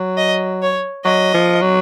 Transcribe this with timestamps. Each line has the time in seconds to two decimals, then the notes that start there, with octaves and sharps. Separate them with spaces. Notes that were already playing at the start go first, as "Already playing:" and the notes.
Already playing: F#3
0.17 D#5
0.62 C#5
1.04 F#3 D#5
1.34 F3
1.61 F#3